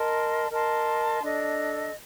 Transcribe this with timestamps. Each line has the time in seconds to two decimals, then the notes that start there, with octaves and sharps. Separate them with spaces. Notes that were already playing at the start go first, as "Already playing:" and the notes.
Already playing: A#4 D#5 A5 C6
0.51 A#4 D#5 A5 C6
1.22 D4 A4 D#5